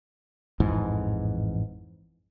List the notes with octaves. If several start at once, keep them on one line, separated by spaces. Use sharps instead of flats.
A1 F2 G#2 E3